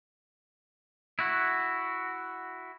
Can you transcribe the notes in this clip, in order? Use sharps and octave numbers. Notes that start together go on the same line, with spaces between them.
E4 F#4